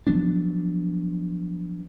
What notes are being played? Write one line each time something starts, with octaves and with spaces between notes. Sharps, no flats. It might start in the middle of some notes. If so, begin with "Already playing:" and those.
F3 F#3 B3 D4